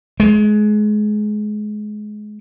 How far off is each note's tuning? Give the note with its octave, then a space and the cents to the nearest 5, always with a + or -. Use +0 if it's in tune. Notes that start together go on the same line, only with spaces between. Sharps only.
G#3 +25